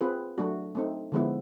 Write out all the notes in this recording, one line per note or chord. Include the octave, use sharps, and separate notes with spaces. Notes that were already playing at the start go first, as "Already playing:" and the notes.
C4 F4 G#4 B4
F#3 A3 D4 F#4
A3 C4 D#4
D3 F3 G#3 B3 E4